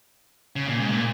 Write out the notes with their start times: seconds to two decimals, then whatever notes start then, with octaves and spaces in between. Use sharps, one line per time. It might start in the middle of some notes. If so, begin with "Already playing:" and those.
0.56 C#3
0.67 A#2
0.80 G#2
0.91 A#2